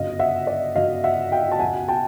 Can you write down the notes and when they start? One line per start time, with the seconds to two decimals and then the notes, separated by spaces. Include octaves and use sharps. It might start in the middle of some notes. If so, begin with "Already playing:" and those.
Already playing: G1 F#2 C#3 D#5 F5
0.19 E5 F#5
0.47 D5 E5
0.76 G1 F#2 C#3 D#5 F5
1.04 E5 F#5
1.32 F5 G5
1.51 A5
1.59 C#2 B2 F#5 G#5
1.88 G5 A5